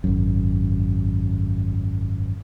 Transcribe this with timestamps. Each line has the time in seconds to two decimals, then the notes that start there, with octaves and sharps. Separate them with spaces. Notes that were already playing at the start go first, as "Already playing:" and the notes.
0.04 G#1 F#2